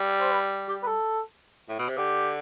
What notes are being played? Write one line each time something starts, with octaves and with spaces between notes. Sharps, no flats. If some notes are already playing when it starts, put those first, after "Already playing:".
Already playing: G3
C5
B4
G4
B4
A4
A2
B2
C3
D3 G4